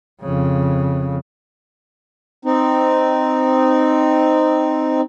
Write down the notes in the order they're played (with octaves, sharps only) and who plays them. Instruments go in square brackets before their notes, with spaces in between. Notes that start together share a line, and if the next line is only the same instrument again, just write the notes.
[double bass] F2 C#3
[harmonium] C4 D#4